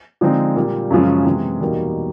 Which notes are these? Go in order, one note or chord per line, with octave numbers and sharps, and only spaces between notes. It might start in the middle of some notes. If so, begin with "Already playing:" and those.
D3 F3 G#3 C4 D#4
A#2 G3 A#3
F#2 C#3 F3 G#3 C#4
C3 E3 G#3 B3 E4
E2 B2 G3 A#3 D#4